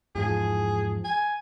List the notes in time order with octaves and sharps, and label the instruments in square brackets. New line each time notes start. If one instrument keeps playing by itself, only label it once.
[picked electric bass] E2 G#2 F3 [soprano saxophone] G#4
[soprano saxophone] G#5